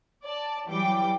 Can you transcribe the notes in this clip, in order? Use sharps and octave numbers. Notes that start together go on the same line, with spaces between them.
D5 A5
E3 F#3 G3 G5 D6